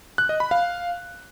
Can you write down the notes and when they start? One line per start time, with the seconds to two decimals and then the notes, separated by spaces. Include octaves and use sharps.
0.18 F#6
0.29 D#5
0.40 B5
0.51 F5